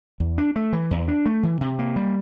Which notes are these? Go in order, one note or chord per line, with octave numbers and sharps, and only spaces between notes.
E2
D4
A3
E3
E2
D4
A3
E3
C3
A#3
G3